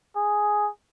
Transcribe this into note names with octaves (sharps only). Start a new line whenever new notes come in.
G#4